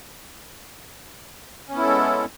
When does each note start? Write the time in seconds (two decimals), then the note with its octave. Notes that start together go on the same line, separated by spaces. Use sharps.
1.68 C#4
1.72 B3
1.77 E4
1.82 A4
1.86 G#3